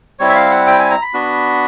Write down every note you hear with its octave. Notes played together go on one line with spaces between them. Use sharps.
G3 C4 E4 C#5
E5
F5
F#5
G5
G#5
A#5
B5
B3 D4 F#4